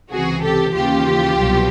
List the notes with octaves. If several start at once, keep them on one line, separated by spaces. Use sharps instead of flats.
C#2 C3 E3 F#4 G#4
G4 A4
D#2 C#3 E3 F4 G4
C2 B2 F#3